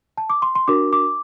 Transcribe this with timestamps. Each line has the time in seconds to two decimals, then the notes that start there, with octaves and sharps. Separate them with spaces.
0.17 A5
0.30 D6
0.42 C6
0.55 C6
0.68 D4 F#4 A#4 D6
0.93 D6